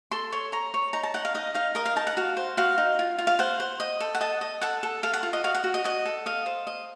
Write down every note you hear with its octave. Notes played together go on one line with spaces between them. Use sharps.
A4 C6
C#5 C6
C#5 A#5
C#5
D#4 A#5
A5
D#4 F#5
F5
D#4 D#5
D#4 F5
A#4 D#5
F5
D#4 A5
F#5
F#4 F5
C5
F#4 F5
D#4
F4
F4
F5
C5 F#5
C5
D#5
A4
F#5
D#5 A5
D#5
A4 F#5
A4
A4 F5
F#5
F4
D#5
F#4 F5
F#5
F#4
D#5
F#4 D#5
A4
D#5 F5
C5
D#5